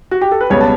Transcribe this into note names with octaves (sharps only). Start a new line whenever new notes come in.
F#4
G4
A4
B4
C#2 B2 G3 B3 C#5
A5